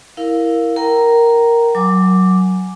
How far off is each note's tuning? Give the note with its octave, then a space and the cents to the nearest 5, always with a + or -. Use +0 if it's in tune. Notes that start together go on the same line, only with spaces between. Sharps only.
E4 +0 A#4 +0 F5 +0
A#4 +0 G5 -35 A#5 +0
F#3 +5 G#5 +0 D6 +0